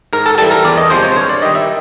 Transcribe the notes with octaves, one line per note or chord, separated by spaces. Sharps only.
G#2 A#4
A4
E3 G3 A4
A#4
E2 D5
D#5
C3 F3 G#3 C5
C#5
C5
G2 C#5
D5
D#3 G3 D#5
E5